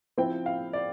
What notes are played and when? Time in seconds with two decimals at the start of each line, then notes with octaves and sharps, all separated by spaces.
0.18 F3 C4 E4 G5
0.46 F5
0.73 D5